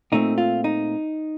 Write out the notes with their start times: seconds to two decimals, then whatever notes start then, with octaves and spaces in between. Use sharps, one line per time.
0.12 A#2 A3 C4 D#4
0.38 F4
0.64 D#4